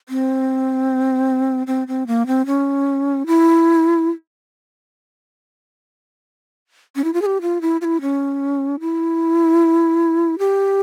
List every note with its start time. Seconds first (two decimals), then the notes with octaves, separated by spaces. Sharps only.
0.09 C4
1.67 C4
1.88 C4
2.07 A#3
2.27 C4
2.46 C#4
3.27 E4
6.96 C#4
7.04 E4
7.14 F4
7.22 G#4
7.26 G4
7.42 F4
7.61 E4
7.81 F4
7.84 E4
8.01 C#4
8.80 E4
10.39 G4